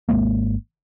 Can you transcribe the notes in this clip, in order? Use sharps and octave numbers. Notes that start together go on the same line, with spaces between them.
G#1 G#2 G#3 A#3